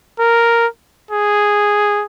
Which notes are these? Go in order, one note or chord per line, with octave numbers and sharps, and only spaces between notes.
A#4
G#4